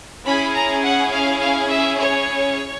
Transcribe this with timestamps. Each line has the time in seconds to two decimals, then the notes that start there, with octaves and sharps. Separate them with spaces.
0.25 C#4 E4 G#4 B5
0.53 A#5
0.82 F#5
1.11 F5
1.40 F5
1.69 E5
1.98 C#5